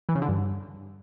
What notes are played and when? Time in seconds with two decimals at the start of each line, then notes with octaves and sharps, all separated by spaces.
0.09 E3
0.15 C#3
0.22 D3
0.28 G2